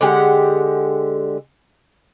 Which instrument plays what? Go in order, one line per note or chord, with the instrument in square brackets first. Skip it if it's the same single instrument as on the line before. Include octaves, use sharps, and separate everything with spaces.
[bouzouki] D3 G#3 G4 F#5